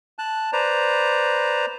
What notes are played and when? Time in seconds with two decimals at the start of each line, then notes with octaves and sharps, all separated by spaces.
0.19 A5 F#6
0.53 B4 C5 D5 A#5